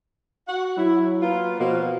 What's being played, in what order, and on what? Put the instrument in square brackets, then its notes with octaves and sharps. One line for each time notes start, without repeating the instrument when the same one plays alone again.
[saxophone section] F#4 F#5
[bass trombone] F#3 [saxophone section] E4
[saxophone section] A#3 B3 F4
[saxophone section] B2 A#3 [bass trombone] F3